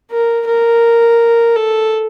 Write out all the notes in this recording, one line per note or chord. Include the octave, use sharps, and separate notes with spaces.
A#4
A#4
A4